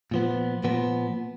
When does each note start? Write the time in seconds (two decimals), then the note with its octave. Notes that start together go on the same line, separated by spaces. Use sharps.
0.11 A#2 F3 B3
0.64 A#2 F3 B3